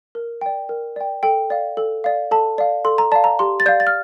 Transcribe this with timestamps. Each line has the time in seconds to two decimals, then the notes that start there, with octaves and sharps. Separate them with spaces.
0.15 A#4
0.41 D5 G5
0.69 A#4
0.96 D5 G5
1.23 A4 G5
1.50 D5 F5
1.77 A4
2.04 D5 F5
2.31 A4 A5
2.58 D5 F5
2.85 A4 C6
2.98 A#5
3.12 D5 F5 A5
3.24 A#5
3.39 G4 C6
3.60 A6
3.66 D5 F5 G6
3.80 A6
3.87 F6